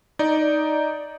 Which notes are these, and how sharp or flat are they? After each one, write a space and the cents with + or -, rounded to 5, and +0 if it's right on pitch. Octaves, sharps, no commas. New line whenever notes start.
D#4 +0 D5 +0